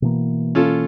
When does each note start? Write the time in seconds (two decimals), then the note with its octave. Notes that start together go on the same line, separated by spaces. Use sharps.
0.02 B2 E3 A#3
0.55 C#4 F4 A4